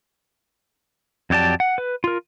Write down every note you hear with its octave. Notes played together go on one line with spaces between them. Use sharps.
F2 F#3 G4 D5 A5
F#5
B4
F4 A#4